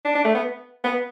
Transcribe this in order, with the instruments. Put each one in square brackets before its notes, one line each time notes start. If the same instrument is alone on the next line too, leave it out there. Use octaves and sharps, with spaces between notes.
[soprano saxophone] D4
D4
A3
B3
B3